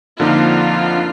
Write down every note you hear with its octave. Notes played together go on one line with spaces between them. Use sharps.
F2 D3 F3 A#3 D#4 F4
D4